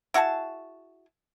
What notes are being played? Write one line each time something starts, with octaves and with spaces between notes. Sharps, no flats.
E4 F#4 G#4 A5